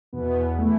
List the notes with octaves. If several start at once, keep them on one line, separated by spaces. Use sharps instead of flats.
E2 B2 B3
E3 A3 E4